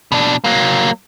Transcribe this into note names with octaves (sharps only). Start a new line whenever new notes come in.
B2 D4
F#3 A#3